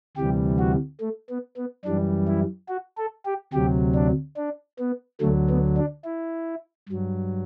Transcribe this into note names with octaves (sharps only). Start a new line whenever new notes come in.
D2 C3 E3 G3 G4
F#4
A3
B3
B3
F#2 E3 G3 D4
E4
F#4
A4
G4
D2 C3 F#3 G4
D4
D4
B3
D2 D3 F#3 A3
B3
D4
E4
G2 F#3